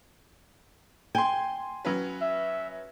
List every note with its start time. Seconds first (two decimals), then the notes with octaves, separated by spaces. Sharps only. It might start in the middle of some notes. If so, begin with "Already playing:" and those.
1.15 G5 G#5 C6
1.85 F#3 C#4 B4
2.22 E5